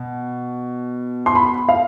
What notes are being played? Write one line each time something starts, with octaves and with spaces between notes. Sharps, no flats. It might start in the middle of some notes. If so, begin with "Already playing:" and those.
Already playing: B2
C6
B5
F5